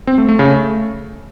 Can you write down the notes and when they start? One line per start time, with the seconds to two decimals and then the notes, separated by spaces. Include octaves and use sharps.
0.07 C4
0.18 A3
0.29 A3
0.39 C#3
0.50 A3